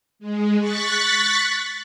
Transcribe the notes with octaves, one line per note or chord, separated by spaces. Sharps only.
G#3
C#6 F#6 A6 B6